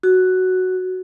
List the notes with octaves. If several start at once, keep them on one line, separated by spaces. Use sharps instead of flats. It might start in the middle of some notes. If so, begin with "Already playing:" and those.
F#4